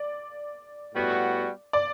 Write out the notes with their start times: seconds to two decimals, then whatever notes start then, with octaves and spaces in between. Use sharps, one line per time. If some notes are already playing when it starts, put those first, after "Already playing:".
Already playing: D5
0.95 A2 G3 B3 F#4
1.73 D5